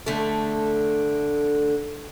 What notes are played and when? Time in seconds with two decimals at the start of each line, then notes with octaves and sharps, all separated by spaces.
0.06 D3 A3